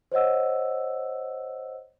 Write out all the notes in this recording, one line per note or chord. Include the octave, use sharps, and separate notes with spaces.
C5 C#5 D#5 F#5 E6